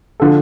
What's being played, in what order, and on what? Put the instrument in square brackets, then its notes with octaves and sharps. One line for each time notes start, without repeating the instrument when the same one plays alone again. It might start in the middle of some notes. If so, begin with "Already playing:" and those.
[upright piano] D3 F3 A4